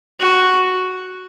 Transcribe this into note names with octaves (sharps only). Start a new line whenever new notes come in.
F#4